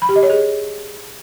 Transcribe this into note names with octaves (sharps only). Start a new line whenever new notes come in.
B5
G4
D#5
C#5
G#4